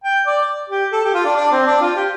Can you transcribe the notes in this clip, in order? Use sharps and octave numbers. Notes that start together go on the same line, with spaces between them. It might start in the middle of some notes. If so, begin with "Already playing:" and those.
G5
D5
G4
A4
G4
F4
D4
D4
C4
D4
F4
G4